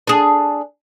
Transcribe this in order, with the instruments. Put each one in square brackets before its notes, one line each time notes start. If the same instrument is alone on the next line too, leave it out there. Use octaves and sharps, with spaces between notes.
[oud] D4 G#4